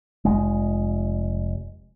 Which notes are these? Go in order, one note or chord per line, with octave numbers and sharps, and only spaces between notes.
F1 G#3